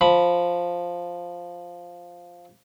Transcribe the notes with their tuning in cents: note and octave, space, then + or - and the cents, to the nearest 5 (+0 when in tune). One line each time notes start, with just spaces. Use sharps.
F3 +0 B5 +0